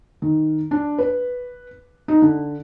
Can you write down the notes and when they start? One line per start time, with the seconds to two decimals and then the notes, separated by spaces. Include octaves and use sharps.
0.22 D#3
0.71 D4
0.99 B4
2.08 D#4
2.22 D3